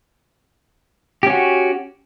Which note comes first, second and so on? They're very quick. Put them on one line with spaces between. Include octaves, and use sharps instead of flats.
G4 C#4 F#4